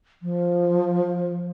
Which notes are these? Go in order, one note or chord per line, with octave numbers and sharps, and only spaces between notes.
F3